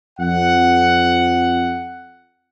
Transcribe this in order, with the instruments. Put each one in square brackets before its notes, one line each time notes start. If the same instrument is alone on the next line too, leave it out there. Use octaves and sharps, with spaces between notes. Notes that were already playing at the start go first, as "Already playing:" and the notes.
[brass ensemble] F2 F#5